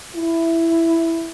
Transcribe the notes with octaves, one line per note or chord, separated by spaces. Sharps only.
E4